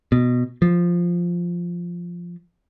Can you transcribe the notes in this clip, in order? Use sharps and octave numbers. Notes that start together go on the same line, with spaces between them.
B2
F3